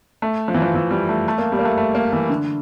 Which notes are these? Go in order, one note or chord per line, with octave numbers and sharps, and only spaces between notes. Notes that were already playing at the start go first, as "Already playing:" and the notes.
A3
F3
E3
F3
E3
G3
A3
A3
A#3
G3
A#3
A3
A3
A#3
E3
D3